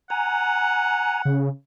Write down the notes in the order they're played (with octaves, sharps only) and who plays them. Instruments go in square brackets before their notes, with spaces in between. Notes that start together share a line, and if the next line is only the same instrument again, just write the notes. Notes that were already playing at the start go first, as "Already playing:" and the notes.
[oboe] F#5 [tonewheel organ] G#5 A#5
[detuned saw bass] C#3